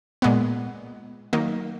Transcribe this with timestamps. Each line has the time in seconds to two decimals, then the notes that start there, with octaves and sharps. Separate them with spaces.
0.22 A#2 G#3 B3
1.33 D#3 F#3 A#3 D#4